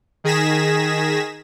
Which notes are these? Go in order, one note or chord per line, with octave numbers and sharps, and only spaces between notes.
D#3 G#4 G#6 A#6 B6 E7